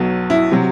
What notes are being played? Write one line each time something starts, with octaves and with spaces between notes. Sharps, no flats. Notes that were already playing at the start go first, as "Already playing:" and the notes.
Already playing: B1 B2 F#3
E4
C3 F#3